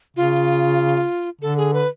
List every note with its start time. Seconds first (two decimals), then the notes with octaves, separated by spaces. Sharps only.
0.17 C#3 F4
1.41 D3 A4
1.57 G#4
1.74 B4